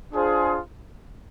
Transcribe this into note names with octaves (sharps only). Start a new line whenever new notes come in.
D4 F4 G#4 C5